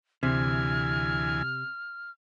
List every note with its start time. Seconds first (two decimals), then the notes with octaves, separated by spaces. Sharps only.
0.23 D2 C3 E3 G#5 F6